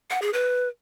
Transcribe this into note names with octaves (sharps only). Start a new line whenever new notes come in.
F#5
G#4
B4